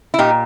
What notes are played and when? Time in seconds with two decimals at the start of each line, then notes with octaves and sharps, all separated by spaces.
0.14 E4
0.19 A#2 D#4 G4